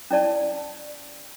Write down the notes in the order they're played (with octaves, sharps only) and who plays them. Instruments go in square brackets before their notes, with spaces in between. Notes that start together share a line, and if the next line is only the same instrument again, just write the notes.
[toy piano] C#4 E4 D5 A5